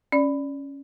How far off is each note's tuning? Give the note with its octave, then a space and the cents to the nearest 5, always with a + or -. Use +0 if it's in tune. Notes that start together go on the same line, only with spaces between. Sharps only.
C#4 +0 D5 +0